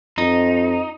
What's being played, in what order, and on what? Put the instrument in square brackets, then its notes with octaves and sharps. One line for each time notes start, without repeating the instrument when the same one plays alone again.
[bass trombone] F2 [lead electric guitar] D#4